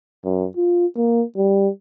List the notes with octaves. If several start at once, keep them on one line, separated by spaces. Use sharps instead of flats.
F#2
F4
A#3
G3